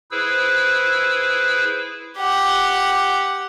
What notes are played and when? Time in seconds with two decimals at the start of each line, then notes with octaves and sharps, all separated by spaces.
0.11 E4 G#4 B4 C5 E6
2.17 G4 F#5